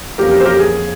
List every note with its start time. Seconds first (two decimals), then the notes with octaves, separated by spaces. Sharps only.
0.18 F2 E3 A#3 C#4 G4 A#4
0.31 G4 A#4
0.40 C5
0.45 G4 A#4
0.59 G#4